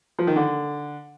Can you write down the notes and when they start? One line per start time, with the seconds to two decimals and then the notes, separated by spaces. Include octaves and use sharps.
0.19 F3
0.27 D#3
0.36 D3